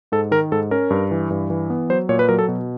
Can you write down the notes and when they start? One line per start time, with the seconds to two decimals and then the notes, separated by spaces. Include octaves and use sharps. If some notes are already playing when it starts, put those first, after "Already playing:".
0.12 G#2 A4
0.31 D#3 A#4
0.52 G#2 A4
0.71 C#4 A#4
0.90 G2
1.11 E3
1.30 G2
1.50 E3
1.70 B3
1.90 F#3 C5
2.09 A#2 C#5
2.19 B4
2.29 F#3 A#4
2.39 A4
2.48 B2